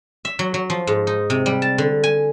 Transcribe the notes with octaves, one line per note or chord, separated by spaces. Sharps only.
E5
F#3
F#3
F3
G#2
D#4
C3
G3
A5
D3
G#5